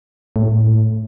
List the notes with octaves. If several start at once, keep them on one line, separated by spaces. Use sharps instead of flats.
A2